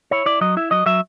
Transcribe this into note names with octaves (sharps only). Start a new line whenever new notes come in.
E4 C#5
E4 D5
F#3 D#5
E4 E5
F#3 D#5
F#3 E5